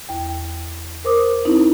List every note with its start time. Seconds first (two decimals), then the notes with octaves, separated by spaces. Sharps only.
0.09 E2 G5
1.04 A#4 C5 D6 D#6
1.45 C4 D#4 E4